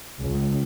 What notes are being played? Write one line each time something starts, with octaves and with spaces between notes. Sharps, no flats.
C#2